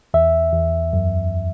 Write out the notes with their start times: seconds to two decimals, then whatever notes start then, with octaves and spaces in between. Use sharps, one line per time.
0.14 E2 E5
0.53 E2
0.93 F#2